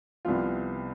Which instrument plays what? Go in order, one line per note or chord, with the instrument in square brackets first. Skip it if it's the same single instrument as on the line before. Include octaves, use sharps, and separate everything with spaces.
[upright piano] C2 C3 F3 B3 F4